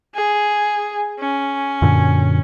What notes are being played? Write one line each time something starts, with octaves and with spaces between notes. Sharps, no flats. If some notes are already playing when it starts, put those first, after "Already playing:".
G#4
C#4
F#2 A#2 D3